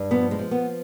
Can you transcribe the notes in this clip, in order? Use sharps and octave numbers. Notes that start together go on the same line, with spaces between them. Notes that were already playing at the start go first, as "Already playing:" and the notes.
Already playing: G2
F3 B3
G#3
F3
B3